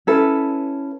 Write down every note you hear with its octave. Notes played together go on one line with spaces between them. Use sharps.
C#4 E4 A4 B4